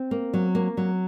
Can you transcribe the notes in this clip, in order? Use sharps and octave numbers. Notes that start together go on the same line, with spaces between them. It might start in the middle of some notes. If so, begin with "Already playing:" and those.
Already playing: C4
A#3
F#3
A#3
F#3